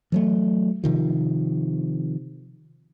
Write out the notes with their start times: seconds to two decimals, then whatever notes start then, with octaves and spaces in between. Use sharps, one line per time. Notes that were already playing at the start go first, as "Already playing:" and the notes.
0.12 E3 F#3 A3
0.84 C3 D#3 F3